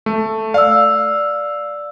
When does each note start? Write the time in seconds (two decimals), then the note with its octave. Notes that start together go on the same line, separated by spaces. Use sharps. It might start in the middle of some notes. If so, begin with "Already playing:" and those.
0.06 A3
0.54 D5 F5 E6